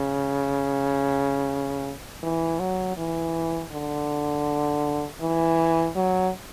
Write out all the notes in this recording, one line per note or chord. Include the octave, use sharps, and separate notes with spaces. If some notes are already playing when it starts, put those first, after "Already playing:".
Already playing: C#3
E3
F#3
E3
D3
E3
F#3